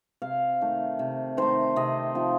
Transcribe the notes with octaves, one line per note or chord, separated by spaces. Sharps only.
C3 F5
D#3 A3
C3
D#3 A3 C5
C3 D#5
F3 C4 D#4